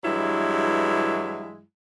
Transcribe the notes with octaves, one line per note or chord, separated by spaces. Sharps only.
G2 E3 F#3 G#3 E4